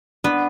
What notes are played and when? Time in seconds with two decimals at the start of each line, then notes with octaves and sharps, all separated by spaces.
0.24 B3 D4 B4